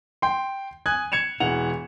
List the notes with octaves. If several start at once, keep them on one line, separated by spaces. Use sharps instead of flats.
G5 C6
G#5 D#6 F#6 G#6
G#6 C#7 E7 F7
E1 E3 F#5 F7